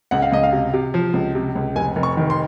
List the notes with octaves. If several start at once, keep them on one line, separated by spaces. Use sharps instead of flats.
C#2 F#5
F5
C#2 D#5
F5
C3
C3
F3
C#2
C3
C#2
F1 G#5
F1
C#6
D#3
C6